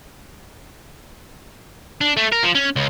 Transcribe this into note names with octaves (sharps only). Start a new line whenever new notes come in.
D4
A3
A#4
F3
C#4
C#2